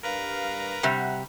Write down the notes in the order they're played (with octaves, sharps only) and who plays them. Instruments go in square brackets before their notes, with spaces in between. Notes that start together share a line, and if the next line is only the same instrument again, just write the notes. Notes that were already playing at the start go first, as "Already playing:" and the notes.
[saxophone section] G2 G3 F5 [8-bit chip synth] A#4 B4 A#5
[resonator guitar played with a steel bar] C3 G3 [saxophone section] F#5